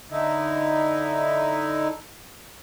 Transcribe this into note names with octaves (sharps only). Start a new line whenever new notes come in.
D3 D#4 E4